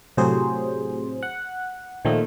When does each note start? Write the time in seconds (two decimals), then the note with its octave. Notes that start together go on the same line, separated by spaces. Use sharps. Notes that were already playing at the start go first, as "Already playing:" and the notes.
0.17 A2 C3 F#3 G#4 C5
1.23 F#5
2.05 A#2 D#3 F3 A3